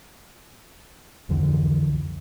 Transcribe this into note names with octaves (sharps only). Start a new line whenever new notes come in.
C2 F2 D3 E3